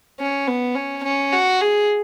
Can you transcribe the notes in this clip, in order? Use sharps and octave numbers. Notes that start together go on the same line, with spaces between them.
C#4
B3
C#4
C#4
F#4
G#4